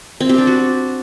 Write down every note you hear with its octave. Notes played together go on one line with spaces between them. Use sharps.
C4
G4
D4
F#4